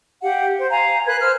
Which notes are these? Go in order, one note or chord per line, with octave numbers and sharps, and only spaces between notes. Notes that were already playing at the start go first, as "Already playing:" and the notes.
G4 F5 F#5
C5
F5 G#5 A#5
A#4 B4 F#6 G#6
C5 F6